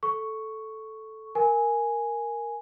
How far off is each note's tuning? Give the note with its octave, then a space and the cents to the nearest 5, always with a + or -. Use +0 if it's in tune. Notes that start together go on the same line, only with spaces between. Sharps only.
A4 -5 C#6 +0
A#4 +0 G#5 +0